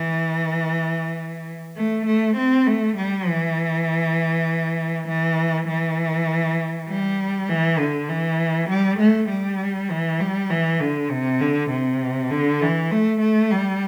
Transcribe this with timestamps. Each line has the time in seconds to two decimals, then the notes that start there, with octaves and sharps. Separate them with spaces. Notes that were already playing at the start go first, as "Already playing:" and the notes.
Already playing: E3
1.76 A3
2.06 A3
2.37 C4
2.67 A3
2.97 G3
3.27 E3
5.08 E3
5.68 E3
6.88 G3
7.49 E3
7.79 D3
8.09 E3
8.69 G3
8.99 A3
9.29 G3
9.90 E3
10.20 G3
10.50 E3
10.80 D3
11.10 C3
11.40 D3
11.71 C3
12.30 D3
12.61 E3
12.91 A3
13.21 A3
13.51 G3